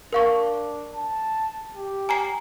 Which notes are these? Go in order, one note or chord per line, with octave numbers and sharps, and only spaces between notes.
D4 A#4 F5 C#6
A5
G4
G#5 A#5 C7